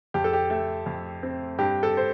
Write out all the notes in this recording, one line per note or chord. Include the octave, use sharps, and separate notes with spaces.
F2 G4
A4
G4
A3 A4
F2
C4
G2 G4
A4
C5